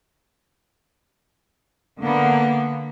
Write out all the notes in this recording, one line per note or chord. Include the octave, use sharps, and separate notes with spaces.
D3 A#3 B3